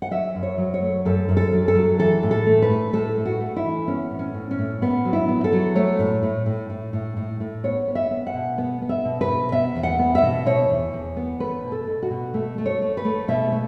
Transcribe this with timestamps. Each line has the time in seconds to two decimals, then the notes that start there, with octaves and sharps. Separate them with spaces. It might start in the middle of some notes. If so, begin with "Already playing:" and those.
0.02 F#5
0.11 F#3 E5
0.35 F#2
0.43 C#5
0.58 F#3
0.74 C#5
0.82 A3
1.05 F#2 A4
1.29 F#2
1.37 A4
1.53 F#3
1.68 A4
1.75 F#3
1.99 E3 A4
2.23 A2
2.31 A4
2.46 A3
2.62 B4
2.70 A2
2.93 A2 A4
3.17 A3
3.25 F#4
3.41 A3
3.56 E4
3.64 E3
3.88 B3 C#4
4.11 A2
4.19 C#4
4.34 A2
4.51 C#4
4.59 A2
4.81 A2 B3
5.05 F#3
5.13 E4
5.28 B3
5.44 A4
5.52 F#3
5.75 A3 C#5
5.99 A2
6.23 A2
6.46 A2
6.70 A2
6.93 A2
7.17 A2
7.40 A2
7.64 B3 C#5
7.88 B3
7.95 E5
8.11 B3
8.27 F#5
8.34 B2
8.58 B3
8.82 B3
8.89 E5
9.05 B2
9.21 B4
9.28 B2
9.52 B3 E5
9.75 E2
9.83 F#5
9.99 B3
10.15 E5
10.22 B2
10.46 B2 C#5
10.69 E2
10.93 E2
11.17 B3
11.40 A3 B4
11.63 B2
11.72 A4
11.87 B2
12.02 F#4
12.11 B2
12.34 A3
12.58 A3
12.66 C#5
12.82 A3
12.97 B4
13.05 A3
13.28 B2 E5
13.52 A3